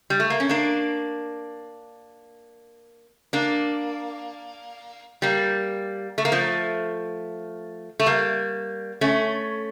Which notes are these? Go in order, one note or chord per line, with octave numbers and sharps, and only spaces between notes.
G3
A3
A#3
C#4
A#3 D4
A#3 D4
G3 A#3
A3
A#3
F3 A3
A3
G3 A#3
A3 C#4